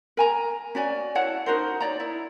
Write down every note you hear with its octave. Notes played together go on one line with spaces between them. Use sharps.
A#4 G#5 A#5
C#4 F#4 D5 G#5
E4 C#5 F#5 A5
D#4 F#4 A#4 C5
D#4 C#5 D5 A#5
E4